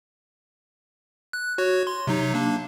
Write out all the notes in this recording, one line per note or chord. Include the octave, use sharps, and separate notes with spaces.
F#6
F#4 C#5
C6
C3 F#3 D#4
A#3 D4